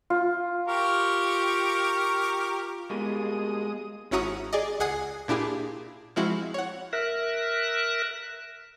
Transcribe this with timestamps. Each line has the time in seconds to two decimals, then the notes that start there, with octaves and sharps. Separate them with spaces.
0.10 F4
0.68 G4 A#4 C#6
2.90 B2 G3 G#3 A#3 D#6
4.11 G#1 C#4 E4 F#4 A#5 D#6
4.53 G#4 D5 D#5
4.80 C#2 G#4 F#5 G#5 D#6 C7
5.28 A#2 D4 E4 G4 G#4
6.16 F3 G#3 C4 E4 F#4
6.54 C#5 F#5
6.93 A#4 E5 F#6